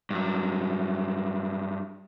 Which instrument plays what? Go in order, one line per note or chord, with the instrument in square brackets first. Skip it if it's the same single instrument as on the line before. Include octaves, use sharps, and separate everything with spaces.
[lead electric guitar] G2 F#3